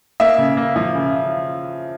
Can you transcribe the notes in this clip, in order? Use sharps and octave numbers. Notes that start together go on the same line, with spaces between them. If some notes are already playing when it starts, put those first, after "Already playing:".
A#3 E5
C#3
A#3
F3
C#3